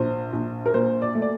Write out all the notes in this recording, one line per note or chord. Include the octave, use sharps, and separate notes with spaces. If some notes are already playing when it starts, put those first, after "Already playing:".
Already playing: A#1 C5
A#1
A#4
A#2 C5
D5
A3
D5